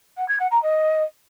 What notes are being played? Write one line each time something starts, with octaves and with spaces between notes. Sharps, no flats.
F#5
G#6
F#5
A#5
D#5